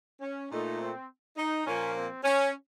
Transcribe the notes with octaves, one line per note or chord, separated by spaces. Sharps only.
C#4
A#2 A3 D#4
C4
D#4
A#2 F3 A#3 C#4
C4
C#4